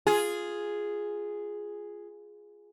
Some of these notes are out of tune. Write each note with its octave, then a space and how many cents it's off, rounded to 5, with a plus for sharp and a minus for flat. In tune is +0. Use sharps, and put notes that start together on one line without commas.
F4 +0 G#4 +0